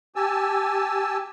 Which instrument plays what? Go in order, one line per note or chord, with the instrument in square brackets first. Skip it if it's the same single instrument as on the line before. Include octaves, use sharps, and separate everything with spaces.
[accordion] G4 G#5 A5 E6